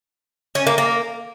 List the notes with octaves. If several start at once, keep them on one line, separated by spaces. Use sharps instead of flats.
C#4
A#3
A#3